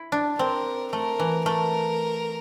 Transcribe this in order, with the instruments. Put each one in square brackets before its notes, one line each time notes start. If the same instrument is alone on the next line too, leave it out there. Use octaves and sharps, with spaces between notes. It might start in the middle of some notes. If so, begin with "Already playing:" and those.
Already playing: [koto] E4
D4
[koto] C4 [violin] A#4
[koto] A3 [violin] A#4
[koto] E3
[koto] A3 [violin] A#4